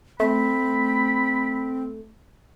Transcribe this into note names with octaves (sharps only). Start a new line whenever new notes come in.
A3 C4 B5